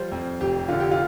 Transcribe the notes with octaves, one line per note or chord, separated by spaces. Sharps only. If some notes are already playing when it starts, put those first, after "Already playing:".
Already playing: F3 G3 C5
F2
F1 G4
D3 F4
G4
F4